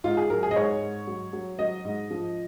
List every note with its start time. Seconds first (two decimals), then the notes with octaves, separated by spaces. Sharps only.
0.04 G#2 F4
0.17 G#4
0.30 F#3 A#4
0.43 G#4
0.51 D#5
0.55 G#2 C#5
0.82 G#2
1.07 F#3
1.33 F#3
1.59 F#3 D#5
1.85 G#2
2.11 F3